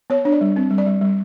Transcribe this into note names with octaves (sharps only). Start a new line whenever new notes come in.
B3 C#5
D4 C#5
D5
G3
C4
G3
D5
G3
G3